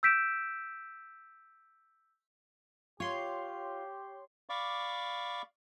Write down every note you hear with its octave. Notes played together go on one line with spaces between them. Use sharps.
E6 G6 B6 D7 E7
F4 G4 C#5 C6
D5 F5 B5 C#6 D6